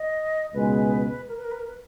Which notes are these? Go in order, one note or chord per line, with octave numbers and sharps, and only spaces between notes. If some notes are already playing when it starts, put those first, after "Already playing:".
Already playing: D#5
C#2 B2 G#3 B4
A#4
B4
A#4
B4
A#4
B4